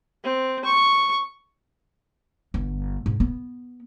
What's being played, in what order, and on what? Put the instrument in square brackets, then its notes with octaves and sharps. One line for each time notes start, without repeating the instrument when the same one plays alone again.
[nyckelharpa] C4
C#6
[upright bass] G1
G#2
B3